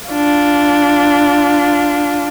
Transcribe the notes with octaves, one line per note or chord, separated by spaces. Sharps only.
D4 F4